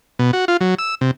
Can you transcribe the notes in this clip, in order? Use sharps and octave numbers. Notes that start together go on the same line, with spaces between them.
B2
F#4
F4
F#3
E6
C3